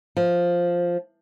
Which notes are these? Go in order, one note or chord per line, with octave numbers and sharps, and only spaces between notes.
F3